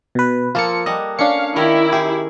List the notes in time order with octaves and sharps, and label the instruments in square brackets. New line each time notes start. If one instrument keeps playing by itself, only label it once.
[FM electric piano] B2 B4
[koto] F3 A#3 A4 [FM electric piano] F4 C#7
[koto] G3 F#5 [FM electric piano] D#5
[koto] C#4 [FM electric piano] D4 C#7 [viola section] F5
[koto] D#3 G4 A#4 [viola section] E4
[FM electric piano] G4 [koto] G#4